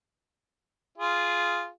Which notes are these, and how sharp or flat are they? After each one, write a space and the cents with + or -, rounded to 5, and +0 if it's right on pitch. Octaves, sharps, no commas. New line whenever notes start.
F4 -5 G#4 +0